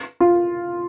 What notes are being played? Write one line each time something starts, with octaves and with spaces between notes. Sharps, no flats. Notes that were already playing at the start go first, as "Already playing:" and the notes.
F4